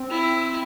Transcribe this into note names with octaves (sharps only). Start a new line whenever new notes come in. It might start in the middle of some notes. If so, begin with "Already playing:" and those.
Already playing: C4
E4